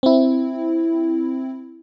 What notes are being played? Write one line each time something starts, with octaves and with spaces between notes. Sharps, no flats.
C4 E4